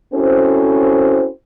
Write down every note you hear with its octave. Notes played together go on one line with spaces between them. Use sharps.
C4 C#4 E4 F#4 A4 C5